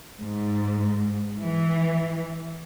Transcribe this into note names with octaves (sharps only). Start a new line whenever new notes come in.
G#2
E3